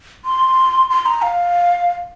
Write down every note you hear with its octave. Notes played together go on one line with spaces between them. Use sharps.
C6
C6
A#5
F5